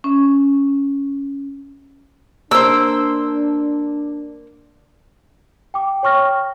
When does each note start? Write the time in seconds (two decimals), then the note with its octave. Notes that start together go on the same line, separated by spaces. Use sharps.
0.04 C#4
2.51 A#3 D4 C5 E6
5.74 G5 D6
6.03 C#5 G5 C#6 F6 A#6